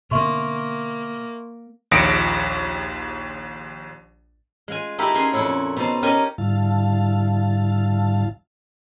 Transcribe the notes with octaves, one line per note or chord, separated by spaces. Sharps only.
B2 D3 A#3 E5 C6 C#6
A#1 D#2 D#6 A#6 C#7 D7
G#3 F4 G#5
D#4 E4 G4 A4 A#4 E5
F#2 G#4 G#5 C6
F2 A#2 E4 A4 C#5
B2 D#4 C5 A5
C#4 G4 A#4 D#5 G#5
G#2 D3 G3 E4 F5 A5